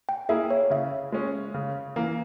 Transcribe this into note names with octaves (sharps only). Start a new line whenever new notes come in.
G5
A#3 E4 G#4 E5
C#5
C#3 E5
G#3 C#4
C#3
E3 A#3